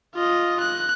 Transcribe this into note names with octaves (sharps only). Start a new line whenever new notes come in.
F4 D#5
F#6